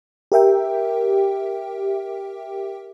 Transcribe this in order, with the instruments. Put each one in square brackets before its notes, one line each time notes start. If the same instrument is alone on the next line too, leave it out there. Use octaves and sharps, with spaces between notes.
[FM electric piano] G4 A#4 E5 G5